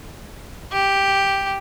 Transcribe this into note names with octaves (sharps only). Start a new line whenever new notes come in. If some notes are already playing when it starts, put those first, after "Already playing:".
G4